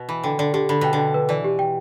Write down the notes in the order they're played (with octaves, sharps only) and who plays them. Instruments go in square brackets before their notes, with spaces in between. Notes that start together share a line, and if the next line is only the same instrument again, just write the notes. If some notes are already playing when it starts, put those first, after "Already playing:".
Already playing: [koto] B2
[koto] E3 [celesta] B5
[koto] D3 [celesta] G5
[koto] D3 [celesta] D5
[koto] D3 [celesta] G4
[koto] D3 [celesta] B5
[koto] B2 [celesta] G5
[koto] D3
[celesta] G5
B4
[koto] E3 [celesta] D5
[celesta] G4
G5